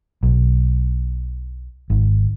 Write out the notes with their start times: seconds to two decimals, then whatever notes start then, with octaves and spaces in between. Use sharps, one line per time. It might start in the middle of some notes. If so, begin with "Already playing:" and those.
0.23 B1
1.90 G#1